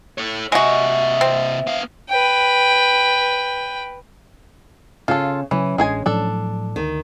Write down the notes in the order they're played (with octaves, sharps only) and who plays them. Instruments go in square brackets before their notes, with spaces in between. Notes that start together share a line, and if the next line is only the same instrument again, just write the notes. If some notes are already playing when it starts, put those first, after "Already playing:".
[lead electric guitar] A4 C#5
[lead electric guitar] C3 D#5 [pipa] G#3 F#4 [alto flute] E5
[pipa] C4
[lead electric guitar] B3 F5
[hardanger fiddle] B4 G5
[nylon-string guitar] C#3 [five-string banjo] F4 A4
[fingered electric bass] C#3 F#3 [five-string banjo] E3 [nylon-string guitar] C#4
[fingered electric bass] A1 D4 [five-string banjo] G#3 G#4 G#5
[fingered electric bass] A2 F3 F#3 [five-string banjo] D4 A4
[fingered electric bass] D2 [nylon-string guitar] D#3